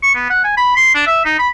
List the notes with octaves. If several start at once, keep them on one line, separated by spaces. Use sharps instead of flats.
C#6
B3
F#5
G#5
B5
C6
D4
E5
D#4
B5